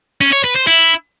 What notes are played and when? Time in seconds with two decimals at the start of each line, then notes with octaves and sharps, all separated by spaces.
0.21 C#4
0.33 C#5
0.44 B4
0.56 C5
0.67 E4